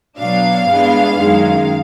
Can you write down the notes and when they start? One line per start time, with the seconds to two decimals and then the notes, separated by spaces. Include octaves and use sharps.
0.18 B2 F#3 B3 D4 F5
0.67 G2 E3 G#3 B3 D4
1.17 F#2 D#3 G#3